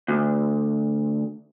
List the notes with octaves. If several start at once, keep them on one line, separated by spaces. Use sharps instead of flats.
D2